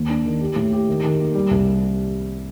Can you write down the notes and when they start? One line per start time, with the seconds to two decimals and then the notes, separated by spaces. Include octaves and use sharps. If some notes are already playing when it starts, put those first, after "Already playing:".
Already playing: D#2
0.09 D4
0.26 D#3
0.41 G4
0.56 A2
0.73 G4
0.89 D#3
1.03 D#3
1.19 A#3
1.34 G3
1.51 C2